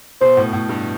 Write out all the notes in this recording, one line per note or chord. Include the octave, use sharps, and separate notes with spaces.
B2 C5
A2
A2
G2